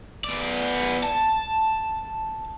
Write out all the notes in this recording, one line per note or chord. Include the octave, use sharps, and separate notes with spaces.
B3 D5
A5